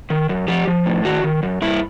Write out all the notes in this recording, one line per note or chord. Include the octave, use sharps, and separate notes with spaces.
D#3
F#2
F3 G4
F3
A2
D#3 F#4
D#3
F#2
G2 E4